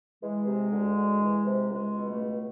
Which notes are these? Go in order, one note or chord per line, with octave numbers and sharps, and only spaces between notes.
E3 G#3
C3
D2
D2
E3
C3
C#2 G#3
B2
A3
C#2